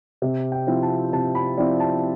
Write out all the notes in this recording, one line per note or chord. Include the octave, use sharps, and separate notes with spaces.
C3
G5
F3 C4 E4
A5
C3 A5
B5
F3 C4 E4 D5
A5